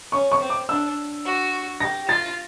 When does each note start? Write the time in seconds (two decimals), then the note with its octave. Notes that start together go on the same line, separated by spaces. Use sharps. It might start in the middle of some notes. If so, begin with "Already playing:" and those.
0.12 C#4 C#6
0.32 C#6
0.41 C4
0.50 D6
0.69 D4 E6
1.25 F#4
1.80 G4 A#6
2.09 F4 A6